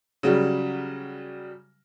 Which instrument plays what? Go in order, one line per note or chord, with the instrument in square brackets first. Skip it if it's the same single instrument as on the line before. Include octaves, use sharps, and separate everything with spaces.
[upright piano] C#3 F#3 G3